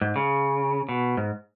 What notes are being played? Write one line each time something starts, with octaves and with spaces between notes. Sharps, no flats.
G#2
C#3
B2
G#2